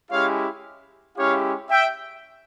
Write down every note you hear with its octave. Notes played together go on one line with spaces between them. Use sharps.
G#3 C#4 E4 G4 C#5 F5
G#3 C#4 E4 G4 C#5 F5
E5 G5